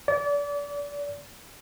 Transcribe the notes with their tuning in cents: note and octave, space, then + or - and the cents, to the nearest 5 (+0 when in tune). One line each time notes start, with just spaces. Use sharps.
D5 -30